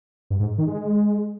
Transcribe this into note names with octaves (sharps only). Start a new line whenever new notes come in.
G2
G#2
D#3
G#3